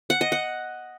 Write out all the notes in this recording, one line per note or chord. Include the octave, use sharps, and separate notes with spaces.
F#5
D#5
F#5